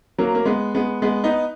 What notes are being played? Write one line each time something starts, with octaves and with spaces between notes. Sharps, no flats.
F#3 A#3
A#3
G#3 B3
G#3 B3
G#3 B3
B3 D#4